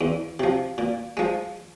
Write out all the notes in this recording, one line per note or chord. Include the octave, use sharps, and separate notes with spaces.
E2
C3 F3
A#2
F3 G#3